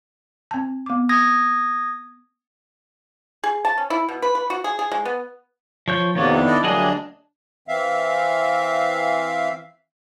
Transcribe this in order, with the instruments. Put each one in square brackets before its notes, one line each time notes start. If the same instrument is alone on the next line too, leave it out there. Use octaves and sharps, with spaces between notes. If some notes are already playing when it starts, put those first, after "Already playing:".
[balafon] C4 A5
B3 D6
[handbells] D#6 G#6 A#6
[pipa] G#4
A5
C#4
E4
B2
B4
B4
F#4
G#4
G#4
G#3
B3
[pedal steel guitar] F3 C#5 G6
[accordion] F2 C3 A#3 [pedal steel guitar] D#3 B3 [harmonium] F#4 C#5 D5
[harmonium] D4 E4 E5
[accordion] A4 D5 D#5
[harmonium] D2 G3 A#3 [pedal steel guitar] F#3 G#4 D#5 [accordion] D4
[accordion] E3 C4 E5 F5